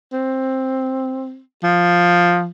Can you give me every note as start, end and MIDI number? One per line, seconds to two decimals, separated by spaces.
0.13 1.40 60
1.64 2.49 53